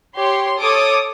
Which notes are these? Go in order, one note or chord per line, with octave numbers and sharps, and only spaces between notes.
G4 C#5 C6
A4 C#5 D6 D#6